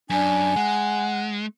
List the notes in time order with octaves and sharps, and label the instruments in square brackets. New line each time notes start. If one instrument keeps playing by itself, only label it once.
[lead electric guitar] F#2 [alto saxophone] D4 [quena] G#5
[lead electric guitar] G#3 [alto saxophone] F#5